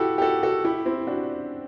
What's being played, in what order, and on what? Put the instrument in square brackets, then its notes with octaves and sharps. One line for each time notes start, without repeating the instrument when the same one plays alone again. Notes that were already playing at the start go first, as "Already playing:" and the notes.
Already playing: [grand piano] E4 F#4 G4 A4
G4
F#4 A4
F#4 A4
E4 G4
C4 E4
D4 F#4